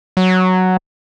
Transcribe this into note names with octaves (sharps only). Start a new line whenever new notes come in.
F#3